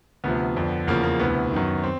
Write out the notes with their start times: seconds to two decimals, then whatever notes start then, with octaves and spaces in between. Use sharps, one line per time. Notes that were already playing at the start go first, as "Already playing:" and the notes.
0.24 D2 C3 F3 B3
0.56 F2 D3 F3
0.87 E2 C#3 F3 A#3
1.03 A#3
1.19 D2 C3 E3 B3
1.52 F#2 D#3
1.84 C4